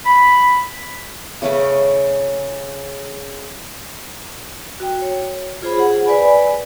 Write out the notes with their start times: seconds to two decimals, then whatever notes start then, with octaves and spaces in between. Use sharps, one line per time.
0.06 B5
1.42 C#3 A3 C#4 B4
4.80 F#4 G5
5.02 C#5
5.62 F4 G#4 C5 B5
5.77 G#4 F#5
6.06 B4 D5 G#5 B5